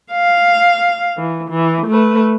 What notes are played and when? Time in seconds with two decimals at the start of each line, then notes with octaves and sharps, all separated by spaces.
0.13 F5
1.18 E3
1.50 E3
1.87 A3 B4